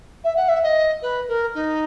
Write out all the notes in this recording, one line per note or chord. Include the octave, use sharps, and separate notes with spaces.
E5
F#5
E5
D#5
B4
A#4
D#4